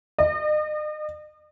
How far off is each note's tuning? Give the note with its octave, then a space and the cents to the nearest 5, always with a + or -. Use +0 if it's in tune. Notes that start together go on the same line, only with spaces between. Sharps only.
D#5 -40